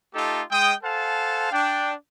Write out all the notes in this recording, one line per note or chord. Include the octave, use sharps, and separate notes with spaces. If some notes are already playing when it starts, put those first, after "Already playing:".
A3 D#4 F4 G4 A4
G#3 G5 D#6
A4 C5 F5 F#5 G#5 A5
D4 G5